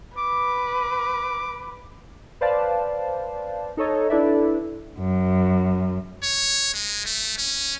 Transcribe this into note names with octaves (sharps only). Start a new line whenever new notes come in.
B4 D6
B4 C5 D5 F5 A5
D#4 A4 C#5 D#5
D4 E4 A4 B4 D5 E5
F#2
C#5
G#3
A3
C#4